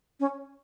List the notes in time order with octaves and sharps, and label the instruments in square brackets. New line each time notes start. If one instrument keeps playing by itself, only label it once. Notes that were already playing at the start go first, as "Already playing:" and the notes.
[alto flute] C#4